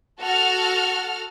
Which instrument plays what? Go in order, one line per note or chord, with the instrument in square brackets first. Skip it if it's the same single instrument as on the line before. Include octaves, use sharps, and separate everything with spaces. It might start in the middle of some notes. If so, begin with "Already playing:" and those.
[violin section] F#4 A4 F6